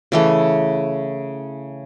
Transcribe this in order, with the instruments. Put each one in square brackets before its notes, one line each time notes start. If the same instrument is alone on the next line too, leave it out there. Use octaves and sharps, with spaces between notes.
[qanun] C#3 E3 A3